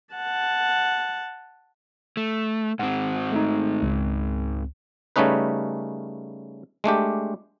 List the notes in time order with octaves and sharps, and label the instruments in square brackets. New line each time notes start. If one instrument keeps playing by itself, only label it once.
[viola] F#5 A5
[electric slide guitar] A3
[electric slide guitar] G#2 C4 [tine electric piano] F#5
[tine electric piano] A3 D#4
C#2
[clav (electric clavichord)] C#3 G3 A3 C#4 D#4 B4
G#3 A3 D4 G4